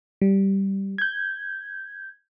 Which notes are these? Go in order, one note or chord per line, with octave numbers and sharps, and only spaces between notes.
G3
G6 G#6